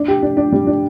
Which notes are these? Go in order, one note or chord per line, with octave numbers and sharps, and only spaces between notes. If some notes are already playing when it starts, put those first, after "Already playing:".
Already playing: D4
G4
D4
D4
G3
D4